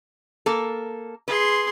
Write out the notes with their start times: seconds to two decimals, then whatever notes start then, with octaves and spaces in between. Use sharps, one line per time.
0.46 A#3 A4
1.28 G#4 B4 C6